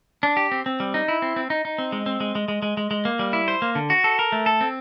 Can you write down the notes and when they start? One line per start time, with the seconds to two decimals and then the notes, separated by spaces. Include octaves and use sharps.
0.23 D4
0.37 G4
0.52 C4
0.66 C4
0.80 G3
0.94 D#4
1.08 E4
1.22 C4
1.36 C4
1.50 D#4
1.65 D#4
1.78 C4
1.92 G#3
2.06 C4
2.20 G#3
2.35 G#3
2.48 G#3
2.62 G#3
2.77 G#3
2.91 G#3
3.05 A#3
3.19 G3
3.33 E4
3.48 C5
3.62 A#3
3.75 D3
3.90 F#4
4.04 A4
4.19 A#4
4.32 A3
4.46 A4
4.61 C4